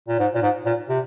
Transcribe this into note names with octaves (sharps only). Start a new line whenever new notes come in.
A#2
G#2
A#2
G#2
A#2
C3